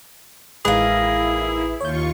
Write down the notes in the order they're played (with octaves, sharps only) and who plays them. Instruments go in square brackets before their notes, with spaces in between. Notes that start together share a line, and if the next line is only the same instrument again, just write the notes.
[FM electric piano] A1 G#3 B4 [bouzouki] D#3 A#3 [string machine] E4 [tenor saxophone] G#4
[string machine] D#2 F4 C#6 [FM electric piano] C#5 G6